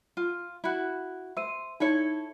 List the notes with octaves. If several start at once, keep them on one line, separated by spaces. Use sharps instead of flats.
F4
E4 F#4
C5 E5 E6 D#7
D#4 E4 A4 C#5 C#7